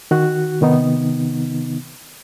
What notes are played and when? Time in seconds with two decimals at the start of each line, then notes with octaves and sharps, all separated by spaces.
0.11 D#3 F#4 F#6
0.61 C3 D#3 B3 D#4